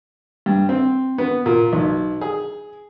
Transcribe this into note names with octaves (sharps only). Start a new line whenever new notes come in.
G2
C4
B3
A#2
B1
G#4